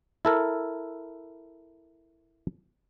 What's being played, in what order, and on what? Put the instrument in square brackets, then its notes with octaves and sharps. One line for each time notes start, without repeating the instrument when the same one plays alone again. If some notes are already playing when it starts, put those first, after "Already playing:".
[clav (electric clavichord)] E4 A4 A#4